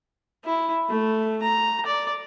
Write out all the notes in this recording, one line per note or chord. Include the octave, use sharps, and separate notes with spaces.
E4
A3
A#5
D5